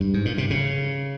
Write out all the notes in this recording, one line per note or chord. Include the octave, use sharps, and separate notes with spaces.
G2
G#2
A#2
C3
C#3